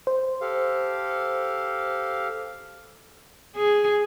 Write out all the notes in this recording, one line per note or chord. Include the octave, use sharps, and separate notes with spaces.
C5
G4 A4 F5
G#4